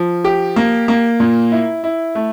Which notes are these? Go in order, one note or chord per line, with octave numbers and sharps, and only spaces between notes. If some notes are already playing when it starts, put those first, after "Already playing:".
Already playing: F3
G4
A#3
A#3
A#2
E4
E4
A3